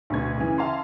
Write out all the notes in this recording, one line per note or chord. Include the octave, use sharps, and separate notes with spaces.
D2 B2 B4 G#6
C#3 E3
E5 F5 A5 A#5 C6